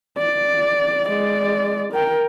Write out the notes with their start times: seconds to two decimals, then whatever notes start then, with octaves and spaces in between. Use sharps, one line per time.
0.18 D5
1.08 G#3 D5
1.93 A#4 G5